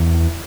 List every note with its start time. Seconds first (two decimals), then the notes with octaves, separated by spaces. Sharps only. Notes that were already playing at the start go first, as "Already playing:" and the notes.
Already playing: E2